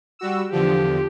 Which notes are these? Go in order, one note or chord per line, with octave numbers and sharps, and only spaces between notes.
G3 F#4 E6
E2 D3 F3 G4